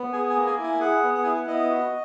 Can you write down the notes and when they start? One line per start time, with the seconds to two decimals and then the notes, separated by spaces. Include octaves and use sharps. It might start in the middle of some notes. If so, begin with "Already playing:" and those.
Already playing: B3
0.13 G#4 G#5
0.30 G#5
0.36 A#3
0.47 G#5
0.58 E4
0.63 G#5
0.80 G#4 F#5
1.03 B3
1.14 F#5
1.23 E4 G#5
1.33 F#5
1.48 B3 D#5
1.70 F#4